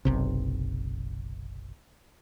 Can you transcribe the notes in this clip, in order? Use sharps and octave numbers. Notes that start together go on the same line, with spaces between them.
F#1 B1 C3